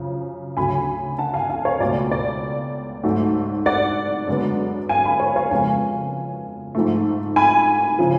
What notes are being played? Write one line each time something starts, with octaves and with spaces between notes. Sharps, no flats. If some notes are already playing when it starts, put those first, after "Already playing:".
Already playing: F#2 C#3 F3
D2 C#3 F#3 G#5 B5
F#5 A5
F5 G#5
F5 G#5
C#5 F5
C#2 B2 A3 D5
D5
G#2 F#3 A3
D5 F#5
F#2 D3 G#3 B3
F5 G#5
G#5 B5
C#5
C#5 F5
F2 C#3 G#3 B3 F5 G#5
G#2 F3 A3
G#5 B5
C#3 F3